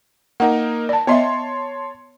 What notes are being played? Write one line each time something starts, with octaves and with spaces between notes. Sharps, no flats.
A#3 D#4 A#4 F#5
D5 A5
B3 C#5 D#5 E5 A5 C6